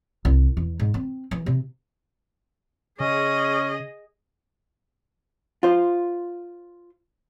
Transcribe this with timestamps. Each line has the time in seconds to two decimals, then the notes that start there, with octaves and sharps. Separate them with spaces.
0.25 C2
0.57 E2
0.80 G#2
0.94 C4
1.31 E3
1.46 C3
3.00 C#3 C#4 G#4 D#5
5.63 F4 C5